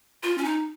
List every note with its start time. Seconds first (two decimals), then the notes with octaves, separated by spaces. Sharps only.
0.23 F4
0.38 C#4
0.44 D#4